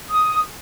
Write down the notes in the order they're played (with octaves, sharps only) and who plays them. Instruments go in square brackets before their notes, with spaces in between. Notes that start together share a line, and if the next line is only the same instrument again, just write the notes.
[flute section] D#6